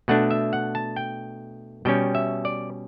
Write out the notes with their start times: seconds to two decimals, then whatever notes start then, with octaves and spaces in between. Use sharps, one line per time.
0.08 B2 A3 D4 F#5
0.31 E5
0.53 F#5
0.75 A5
0.96 G5
1.85 B2 G3 C#4 G5
2.15 E5
2.45 D5